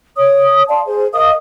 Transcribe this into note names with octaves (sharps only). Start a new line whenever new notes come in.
C#5 D#6
D5 F5 A5 C6
G#4 C5
A#4 D#5 F5 D#6